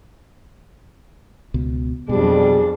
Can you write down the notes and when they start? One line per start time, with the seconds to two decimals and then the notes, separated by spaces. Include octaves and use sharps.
1.54 C#2 B2
2.09 F2 B2 F#3 G3 D4 G#4